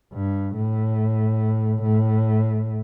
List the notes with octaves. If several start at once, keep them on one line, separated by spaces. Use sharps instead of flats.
G2
A2
A2